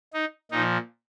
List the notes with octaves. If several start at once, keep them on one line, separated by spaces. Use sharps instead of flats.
D#4
A#2 F3 D#4